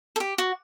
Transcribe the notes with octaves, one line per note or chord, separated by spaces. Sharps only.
A4
G4
F#4